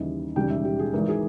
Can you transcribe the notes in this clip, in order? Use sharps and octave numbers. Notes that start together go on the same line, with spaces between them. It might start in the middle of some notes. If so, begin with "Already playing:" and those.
Already playing: D#2 C#3 E3 G3 D#5
E1 D#2 C#3 G3 G5
E5
G4
G#4
G#1 G#2 E3 A#4
G#4